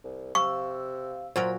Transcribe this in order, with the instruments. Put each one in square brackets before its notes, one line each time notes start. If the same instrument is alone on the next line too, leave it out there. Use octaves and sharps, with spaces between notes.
[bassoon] C2
[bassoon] C3 [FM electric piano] F5 E6 [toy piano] C#6
[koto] A#2 F#3 A#4 [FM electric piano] C5